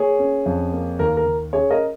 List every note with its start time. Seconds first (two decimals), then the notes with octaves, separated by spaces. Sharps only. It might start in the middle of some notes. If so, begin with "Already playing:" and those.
Already playing: A#3 G#4 C#5
0.19 C#4
0.46 F2
0.73 A#3
0.99 D#2 A#4
1.17 A#4
1.26 D#2
1.53 C#4 G#4 C#5
1.71 A#4 D#5